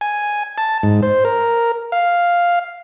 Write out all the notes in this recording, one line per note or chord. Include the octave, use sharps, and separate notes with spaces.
G#5
A5
G#2
C5
A#4
F5